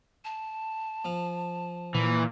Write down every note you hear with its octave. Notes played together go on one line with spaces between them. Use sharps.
A5
F3 F5
A#2 E3